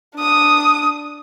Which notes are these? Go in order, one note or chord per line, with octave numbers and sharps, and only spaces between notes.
D4 D#6